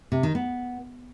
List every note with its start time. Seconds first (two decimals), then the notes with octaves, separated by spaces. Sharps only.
0.12 C3
0.23 D#3
0.35 B3